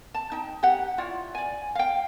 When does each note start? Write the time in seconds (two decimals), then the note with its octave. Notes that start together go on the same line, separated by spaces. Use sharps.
0.14 A5
0.32 D#4 G5
0.63 G4 F#5
0.98 E4 F4 C#5 D5
1.35 D5 G#5
1.75 F5 G5